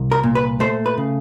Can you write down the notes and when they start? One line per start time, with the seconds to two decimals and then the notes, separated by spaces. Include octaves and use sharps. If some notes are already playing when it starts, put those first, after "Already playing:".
Already playing: C2
0.12 A#4
0.23 A#2
0.35 B4
0.60 A3 C5
0.86 B4
0.98 C#3